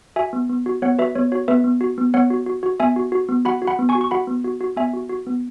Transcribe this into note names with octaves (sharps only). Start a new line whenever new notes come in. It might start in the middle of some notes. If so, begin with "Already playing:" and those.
F#4 E5 G#5
B3
B3
F#4
B3 C#5 F#5
F#4 B4 E5
B3 C#5
F#4 C#5
B3 B4 E5
B3
F#4
B3
B3 C#5 F#5
F#4
F#4
F#4
B3 E5 G#5
F#4
F#4
B3
F#4 F#5 B5
F#4
F#5 B5
B3
G#5 C#6
F#4
C#6
F#4 F#5 B5
B3
F#4
F#4
B3 E5 G#5
F#4
F#4
B3